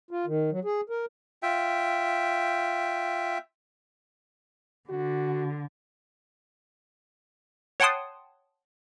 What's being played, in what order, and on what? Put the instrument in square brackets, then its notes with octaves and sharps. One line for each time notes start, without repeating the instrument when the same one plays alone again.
[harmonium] F4
D#3
F#3
G#4
A#4
[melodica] F4 E5 G5
[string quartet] D3 [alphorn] F#4
[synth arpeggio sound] C#5 F#5 G5 A5 C6 D#6